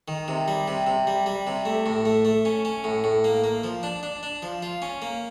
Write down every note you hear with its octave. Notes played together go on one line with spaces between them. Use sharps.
D#3
C3
G3
C3
C3
G3
G3
C3
A3
A2
A3
A3
C#4
C#4
A2
A2
A#3
A#3
F3
D4
D4
D4
F3
F4
C#4
A#3